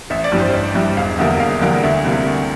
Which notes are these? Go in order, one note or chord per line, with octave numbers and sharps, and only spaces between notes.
A1 E5
D5
G2 E3 G3
C5
A1
G2 E3 G3 E5
E1 F5
E2 D3 G3 A#3 E5
E1 F5
E2 D3 G3 A#3
D2 E5
C3 E3 G3 A#3
D2